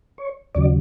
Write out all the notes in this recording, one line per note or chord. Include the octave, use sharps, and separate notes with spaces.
C#5
D#2 C#3 F#3 D5